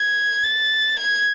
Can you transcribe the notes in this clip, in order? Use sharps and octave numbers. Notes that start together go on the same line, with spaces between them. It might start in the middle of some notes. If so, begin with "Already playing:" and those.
Already playing: G#6
A6
G#6